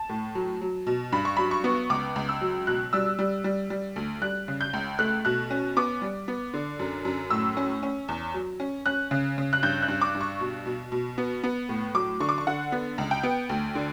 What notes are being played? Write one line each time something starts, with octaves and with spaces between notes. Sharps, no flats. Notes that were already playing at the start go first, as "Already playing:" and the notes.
Already playing: A5
A2
F#3
F#3
B2
G2 B5
C#6
F#3 B5
C#6
B3
C#2 D6
C#2
E6
F#3
B2 F#6
G3 E6
G3
G3
G3
D2
G3 F#6
C#3
G6
C#2
A3 F#6
B2 F#6
C#4
B3 D6
G3
B3
D3
F#2
F#2
A2 E6
C#4
C#4
E2
F#3
C#4
C#4 F#6
C#3
C#3
F#6
G2 G6
F#6
G2
D6
G2
C#6
B2
B2
B2
B3
B3
A2
F#3 D6
D3 C#6
D6
C#6
D3 F#5
B3
C#2
G5
B3
D2
D3